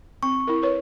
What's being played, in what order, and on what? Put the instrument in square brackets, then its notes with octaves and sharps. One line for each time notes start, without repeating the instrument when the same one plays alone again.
[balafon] C4 [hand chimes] C#6
[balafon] E4 A#4
B4 C#5